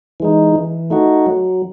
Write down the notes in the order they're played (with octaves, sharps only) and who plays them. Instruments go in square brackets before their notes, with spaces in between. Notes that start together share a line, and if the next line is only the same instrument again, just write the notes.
[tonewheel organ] E3 G#3 D#4
E3
A3 D#4 F#4
F#3